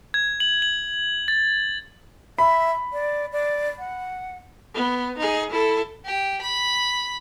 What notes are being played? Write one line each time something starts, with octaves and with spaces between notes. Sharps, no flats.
G#6
F#7
F#7
A6
E5 B5
D5
D5
F#5
B3
D#4 G#4
E4 A4
G4
B5